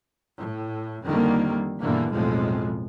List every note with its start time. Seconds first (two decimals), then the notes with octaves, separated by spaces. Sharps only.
0.38 A2
1.05 F2 D3 D#3 G3 A#3
1.80 G2 B2 D3 E3 A#3
2.12 B1 F2 A2 F3 G#3